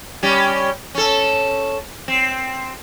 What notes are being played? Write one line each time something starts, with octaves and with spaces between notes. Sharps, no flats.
G3 C#4 G4
C#4 A4
C4